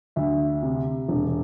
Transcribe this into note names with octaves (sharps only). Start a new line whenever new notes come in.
D2 E5
C3
E1